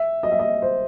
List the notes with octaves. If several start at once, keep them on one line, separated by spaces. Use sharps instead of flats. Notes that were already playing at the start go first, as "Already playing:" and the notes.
Already playing: E5
D#5
E5
D#5
C5